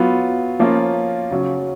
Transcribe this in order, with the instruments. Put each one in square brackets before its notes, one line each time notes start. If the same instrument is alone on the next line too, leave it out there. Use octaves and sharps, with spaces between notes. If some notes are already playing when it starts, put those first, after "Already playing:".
Already playing: [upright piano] F#3 B3 F4
F3 A#3 C#4 F4
C#3 F#3 C#4